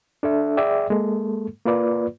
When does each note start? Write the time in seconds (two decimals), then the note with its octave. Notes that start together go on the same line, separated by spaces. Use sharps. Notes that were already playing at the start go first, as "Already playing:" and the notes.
0.23 D4 A4 E5
0.57 G#4 D5 E5 G5
0.90 G#3 A#3 A4
1.66 A#3 F4 B4 D5